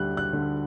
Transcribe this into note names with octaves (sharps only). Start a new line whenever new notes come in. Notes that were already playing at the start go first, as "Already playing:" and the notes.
Already playing: D2 D3 G3 F#6
F#6
D3